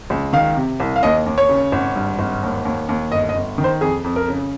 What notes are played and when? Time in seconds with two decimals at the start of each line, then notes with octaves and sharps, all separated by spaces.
0.10 C#2
0.33 D#3 F5
0.57 C3
0.80 C2
0.96 F5
1.03 D#2 D#5
1.26 D#2
1.38 C#5
1.49 C#3
1.72 G#1
1.96 G2
2.19 G#1
2.43 D#2
2.65 D#2
2.89 D#2
3.12 G1 D#5
3.29 D#5
3.35 G1
3.58 D#3
3.64 C5
3.81 F2 G#4
4.04 F2
4.16 A#4
4.28 C#3